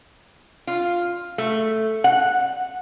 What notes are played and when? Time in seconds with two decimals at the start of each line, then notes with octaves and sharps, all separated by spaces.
0.67 F4
1.38 A3
2.04 F#5